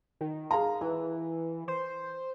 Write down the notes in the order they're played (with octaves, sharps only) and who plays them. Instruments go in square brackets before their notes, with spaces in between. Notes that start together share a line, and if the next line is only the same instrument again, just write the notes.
[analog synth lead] D#3
[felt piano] G#4 F5 A#5
[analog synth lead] E3 [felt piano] B4
[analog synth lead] C5